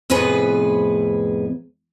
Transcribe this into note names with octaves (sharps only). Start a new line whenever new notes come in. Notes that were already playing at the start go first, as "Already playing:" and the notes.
F2 A2 C3 B3 G#4 B4